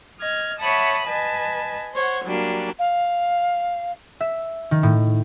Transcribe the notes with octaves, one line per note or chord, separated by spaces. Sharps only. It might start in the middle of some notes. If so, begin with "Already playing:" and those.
D#5 F6 G#6
C#5 E5 F#5 A5 B5 D#6
B4 D#5 G#5 A5
C5 C#5 F#5
F#3 G3 A#3 D4
F5
E5
D#3
A2